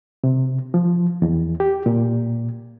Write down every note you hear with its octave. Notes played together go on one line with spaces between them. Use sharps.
C3
F3
E2
G4
A#2